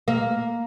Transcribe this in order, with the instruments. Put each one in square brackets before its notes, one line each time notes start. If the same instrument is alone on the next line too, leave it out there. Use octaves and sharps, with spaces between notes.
[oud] A#3